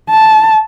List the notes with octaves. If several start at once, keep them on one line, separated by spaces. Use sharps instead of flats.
A5